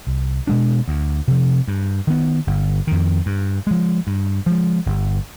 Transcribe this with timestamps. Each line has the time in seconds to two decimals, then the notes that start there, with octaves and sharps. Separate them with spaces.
0.07 C2
0.47 B2 G#3 D4
0.88 D2
1.28 C3 F3
1.68 G2
2.07 D#3 B3
2.47 G1
2.87 F2 D#3
3.26 G2
3.67 F3 G#3
4.07 G2
4.46 F3 G#3
4.86 G1